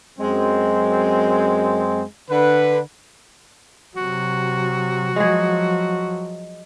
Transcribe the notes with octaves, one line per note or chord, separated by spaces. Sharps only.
F#2 G#3 C4
D3 B4
C3 F#3 F#4
F3 F#3 G#3 G#4